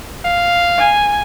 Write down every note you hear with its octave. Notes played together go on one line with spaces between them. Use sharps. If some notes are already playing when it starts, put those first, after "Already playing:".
F5
G#5